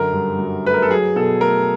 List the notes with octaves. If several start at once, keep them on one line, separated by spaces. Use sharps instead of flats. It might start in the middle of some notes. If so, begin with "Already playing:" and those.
Already playing: F#2 D3 A#4
G2
F#3
A3 B4
A#4
A4
F#3 G#4
B2 A4
A3 A#4